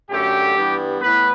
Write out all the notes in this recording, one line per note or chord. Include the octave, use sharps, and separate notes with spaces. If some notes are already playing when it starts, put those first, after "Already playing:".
F#2 D3 F#3 A3 G4
G2 E3 G3 B3
A2 E3 B3 B4